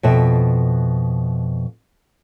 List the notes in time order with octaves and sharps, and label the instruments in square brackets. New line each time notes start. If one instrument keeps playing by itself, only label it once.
[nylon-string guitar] F2 B2 E5